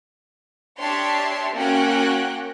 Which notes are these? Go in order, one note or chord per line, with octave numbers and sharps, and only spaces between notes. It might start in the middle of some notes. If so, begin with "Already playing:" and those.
D4 G4 C#5 E5 A5 C6
A#3 C#4 F#4 G5 F#6